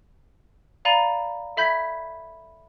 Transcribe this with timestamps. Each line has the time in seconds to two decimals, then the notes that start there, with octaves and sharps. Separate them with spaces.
0.85 D5 F5 A#5 B5 A6 D#7
1.57 A4 E5 B5 G6 G#6 B6